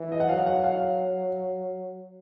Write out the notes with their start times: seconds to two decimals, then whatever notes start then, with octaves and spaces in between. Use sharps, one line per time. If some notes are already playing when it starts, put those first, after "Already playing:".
Already playing: E3
0.12 D#5
0.20 F#5
0.29 F#3 F5
0.46 F#5
0.64 F5